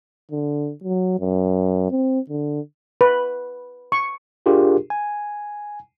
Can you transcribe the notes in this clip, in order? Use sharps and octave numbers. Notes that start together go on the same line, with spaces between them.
D3
F#3
F#2
C4
D3
B4
C#6
D4 F4 G4 G#4 A#4
G#5